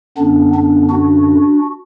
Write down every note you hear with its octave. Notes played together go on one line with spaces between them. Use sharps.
F#2 D3 B3 D4
B3 D4
D4 F#4